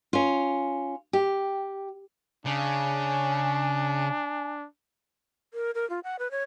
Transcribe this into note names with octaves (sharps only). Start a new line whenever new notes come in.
C#4 F4
G4
C#3 D4 G#5
A#4
A#4
F4
F#5
B4
C#5